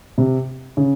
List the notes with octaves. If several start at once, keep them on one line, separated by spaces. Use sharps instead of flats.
C3
C#3